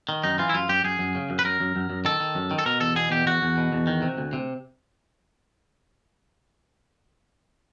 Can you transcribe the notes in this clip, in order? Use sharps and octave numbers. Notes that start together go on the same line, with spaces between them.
D#3
F#2 D#4
E3 F4
E4
F#2 F4
F#2 G4
F#2 G#4
F#2
C#3
F#2
B4
F#2 A#4
F#2
F#2
F#2
D#3 A4
D#3
F#2
D#3
A4
B2 A#4
E2 A4
B2 G#4
E2 G4
E2 F#4
E2
B2
E2
D#3
C3
D2
C3